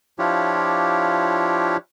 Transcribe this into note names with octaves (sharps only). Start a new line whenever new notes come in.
F3 D4 E4 F4 G4 C#5